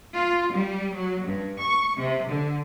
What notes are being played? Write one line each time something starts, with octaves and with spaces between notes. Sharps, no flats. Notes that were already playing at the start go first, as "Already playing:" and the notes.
F4
G3
F#3
G2
C#6
C3
D3